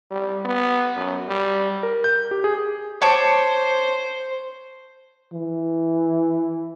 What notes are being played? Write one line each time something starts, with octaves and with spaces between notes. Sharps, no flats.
G3
B3
F#2
G3
A#4
G6
G4
G#4
C5 C#5 A5 D6
E3